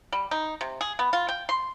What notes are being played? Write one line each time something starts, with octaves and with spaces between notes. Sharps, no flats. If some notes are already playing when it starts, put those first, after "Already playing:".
G3
D#4
C3
G#4
B3
F4
G5
C6